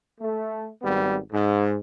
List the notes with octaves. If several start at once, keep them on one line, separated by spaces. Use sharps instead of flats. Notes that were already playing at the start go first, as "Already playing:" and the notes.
A3
G#1 G3 B3
G#2